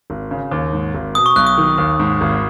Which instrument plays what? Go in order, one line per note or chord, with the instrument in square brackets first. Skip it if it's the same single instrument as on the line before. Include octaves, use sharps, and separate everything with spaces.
[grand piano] G#1
C#3
D#2
G#2
G#1
[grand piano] B2 [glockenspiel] D#6
[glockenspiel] C#6
[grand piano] B1 [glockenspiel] F#6
[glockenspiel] D#6
[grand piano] D#3
D#2
G#2
G#1